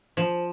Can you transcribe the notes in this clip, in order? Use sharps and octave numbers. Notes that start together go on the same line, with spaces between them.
F3